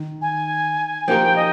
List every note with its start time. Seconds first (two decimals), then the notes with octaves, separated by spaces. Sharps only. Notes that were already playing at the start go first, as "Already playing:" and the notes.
Already playing: D#3
0.22 G#5
1.08 F3 A#3 D#4 G4 A#4 G5
1.36 D#5